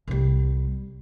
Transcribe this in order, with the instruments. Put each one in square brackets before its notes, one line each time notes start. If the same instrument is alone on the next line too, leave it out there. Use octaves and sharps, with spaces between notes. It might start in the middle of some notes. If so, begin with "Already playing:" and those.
[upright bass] C2 G3